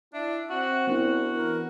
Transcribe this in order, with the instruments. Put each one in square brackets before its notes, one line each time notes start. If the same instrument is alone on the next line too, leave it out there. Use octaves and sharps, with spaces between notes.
[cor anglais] D4 [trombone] E4 [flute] E5
[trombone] C4 [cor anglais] F#4
[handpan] B3 D4 E4 [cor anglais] F#4 [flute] A#4
[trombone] E3 [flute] A#4